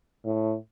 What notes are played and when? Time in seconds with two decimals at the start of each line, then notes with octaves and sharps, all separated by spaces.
0.25 A2